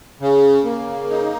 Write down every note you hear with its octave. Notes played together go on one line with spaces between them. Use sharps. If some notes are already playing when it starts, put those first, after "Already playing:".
C#3
A#3
D#4